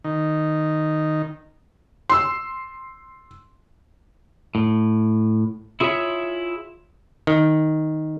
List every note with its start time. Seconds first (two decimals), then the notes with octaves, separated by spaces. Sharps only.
0.04 D#3
2.10 C6 E6
4.55 A2
5.80 E4 F4 G#4 A4 C#5 E5
7.27 D#3